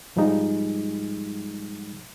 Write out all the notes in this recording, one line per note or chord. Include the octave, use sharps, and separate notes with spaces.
G#2 F3 G3 G#3 D#4 G#4